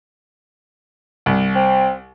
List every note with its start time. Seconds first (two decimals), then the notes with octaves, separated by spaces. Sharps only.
1.26 C2
1.55 C4